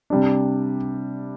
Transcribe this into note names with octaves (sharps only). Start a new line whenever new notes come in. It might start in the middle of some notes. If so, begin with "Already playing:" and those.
C3 G3 D4